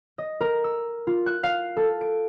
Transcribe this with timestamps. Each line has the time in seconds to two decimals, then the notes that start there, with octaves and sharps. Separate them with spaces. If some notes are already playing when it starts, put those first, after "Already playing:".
0.18 D#5
0.41 A#4
0.64 E6
1.07 F4
1.26 F#6
1.43 F5
1.77 A4
2.01 D7